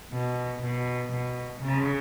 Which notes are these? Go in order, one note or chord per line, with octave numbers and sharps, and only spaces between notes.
B2
B2
B2
C#3